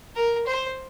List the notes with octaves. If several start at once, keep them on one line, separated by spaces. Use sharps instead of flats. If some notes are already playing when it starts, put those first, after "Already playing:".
A#4
C5